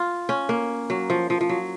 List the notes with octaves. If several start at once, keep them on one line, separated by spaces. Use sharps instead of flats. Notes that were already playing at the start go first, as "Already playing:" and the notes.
Already playing: F4
C#4
A#3
F#3
F3
F3
F3
F#3